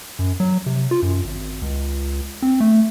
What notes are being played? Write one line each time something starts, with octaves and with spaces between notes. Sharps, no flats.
F#2
F#3
C3
F4
F#2
G#1
C#2
C4
A3